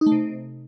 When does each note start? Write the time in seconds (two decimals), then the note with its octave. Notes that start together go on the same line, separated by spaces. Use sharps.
0.01 D#4
0.06 A3
0.12 C3